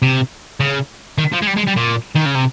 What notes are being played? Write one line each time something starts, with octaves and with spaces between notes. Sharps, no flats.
C3
C#3
D#3
F3
G#3
G3
G#3
G3
A#2
D#3
C#3
C3